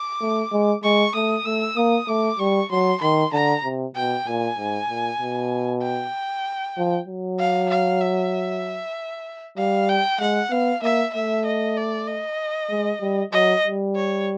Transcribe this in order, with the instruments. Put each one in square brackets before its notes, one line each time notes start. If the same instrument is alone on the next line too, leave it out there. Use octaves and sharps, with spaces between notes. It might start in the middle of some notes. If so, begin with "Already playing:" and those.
Already playing: [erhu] D6
[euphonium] A3
G#3
[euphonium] G#3 [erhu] C#6
[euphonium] A3 [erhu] D#6
[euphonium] A3 [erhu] E6
[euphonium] A#3 [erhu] D#6
[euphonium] A3 [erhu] D6
[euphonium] G3 [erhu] C#6
[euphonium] F#3 [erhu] C6
[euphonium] D#3 [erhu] C6
[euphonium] D3 [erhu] A#5
[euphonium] C3
[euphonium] B2 [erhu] G5
[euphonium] A#2 [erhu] G#5
[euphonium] G#2
A#2
B2
[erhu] G5
[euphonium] F3
F#3
[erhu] F5
F5
E5
[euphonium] G3 [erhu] F5
[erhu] G5
[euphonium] G#3 [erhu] F#5
[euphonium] B3 [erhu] F5
[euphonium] A#3 [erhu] E5
[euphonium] A3 [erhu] E5
[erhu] D#5
D5
D#5
[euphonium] G#3
G3
[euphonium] F#3 [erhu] D#5
[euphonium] G3
[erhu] C#5